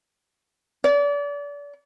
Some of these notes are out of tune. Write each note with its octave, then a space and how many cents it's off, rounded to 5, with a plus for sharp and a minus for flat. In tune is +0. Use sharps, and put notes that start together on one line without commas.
D5 -35